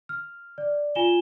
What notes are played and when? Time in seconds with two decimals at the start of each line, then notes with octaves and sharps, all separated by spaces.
0.09 F6
0.58 D5
0.95 F4 G#5 E7 G7